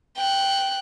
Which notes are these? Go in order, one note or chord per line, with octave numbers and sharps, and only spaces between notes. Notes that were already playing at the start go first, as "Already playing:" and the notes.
G5 F#6